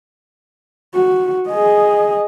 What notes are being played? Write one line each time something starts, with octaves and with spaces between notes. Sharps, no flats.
F#4
G#4 D#5